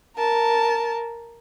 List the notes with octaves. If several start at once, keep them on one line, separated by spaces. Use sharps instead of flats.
A#4 A5